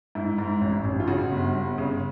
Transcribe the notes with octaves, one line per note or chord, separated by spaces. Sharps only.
G#2 E4
G#2
A1
A1
F4
C#3 F#4
G1
G1
C#3